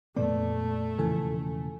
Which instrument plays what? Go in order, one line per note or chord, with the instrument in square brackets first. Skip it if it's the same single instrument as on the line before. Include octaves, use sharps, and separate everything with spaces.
[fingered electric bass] F2 A#2 B3 [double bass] A3 [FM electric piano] D5
[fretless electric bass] E1 C#3 F3 [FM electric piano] E3 A4 G#5